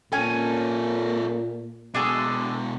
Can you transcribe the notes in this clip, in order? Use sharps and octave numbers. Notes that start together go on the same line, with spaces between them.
A#2 A#3 C#4 A4 G#5
B2 G#3 D4 G#4 A4